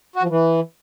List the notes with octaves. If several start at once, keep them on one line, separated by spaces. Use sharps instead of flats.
F#4
F3
E3